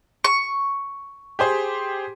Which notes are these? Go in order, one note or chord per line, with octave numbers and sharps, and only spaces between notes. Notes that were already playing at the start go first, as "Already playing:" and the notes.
C#6
G4 G#4 C5